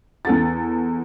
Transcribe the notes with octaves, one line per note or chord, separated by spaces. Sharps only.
E2 A4 A6